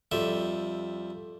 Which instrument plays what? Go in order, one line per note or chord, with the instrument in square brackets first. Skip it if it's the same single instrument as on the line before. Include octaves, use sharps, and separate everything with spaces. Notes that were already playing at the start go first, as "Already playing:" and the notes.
[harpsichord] F2 G3 E5